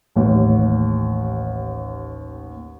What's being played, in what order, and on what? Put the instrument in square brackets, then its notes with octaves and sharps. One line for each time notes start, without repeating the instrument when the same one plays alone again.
[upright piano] A1 D#2